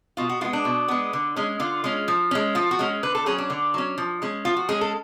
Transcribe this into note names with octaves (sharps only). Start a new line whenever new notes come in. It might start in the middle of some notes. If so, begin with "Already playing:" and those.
B2 F4
F#4
G#3 B3 F4
D4
B2
G#3 B3
D3
G#3 C#4
D3 F4
G#3 C#4
F3
G#3 C#4
F3 F4
F#4
G#3 C#4
D3 B4
A4
F#3 C#4 G#4
D4
D3
F#3 C#4
F3
G#3 C#4
F3 F4
F#4
G#3 C#4 G#4
A4